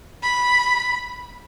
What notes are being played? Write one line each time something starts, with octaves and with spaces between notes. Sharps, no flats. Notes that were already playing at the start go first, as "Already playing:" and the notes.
B5